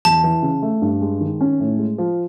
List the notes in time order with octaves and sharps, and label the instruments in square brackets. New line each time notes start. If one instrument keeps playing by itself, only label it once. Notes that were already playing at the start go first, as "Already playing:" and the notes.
[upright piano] E2 [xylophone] A5
[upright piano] E3
C#3
A3
G2
G#3
D#3
C#4
A2
G#3
F3